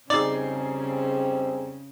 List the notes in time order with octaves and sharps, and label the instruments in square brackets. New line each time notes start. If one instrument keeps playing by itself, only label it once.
[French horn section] F2 G3 C4 [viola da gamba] C#3 [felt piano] D#4 G#4 [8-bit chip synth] D5